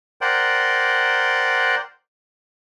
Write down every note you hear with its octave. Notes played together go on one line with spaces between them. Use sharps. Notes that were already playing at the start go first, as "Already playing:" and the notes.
A#4 C5 D5 F#5 G5